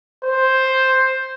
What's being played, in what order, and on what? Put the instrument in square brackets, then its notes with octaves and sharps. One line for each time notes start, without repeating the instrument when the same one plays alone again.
[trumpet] C5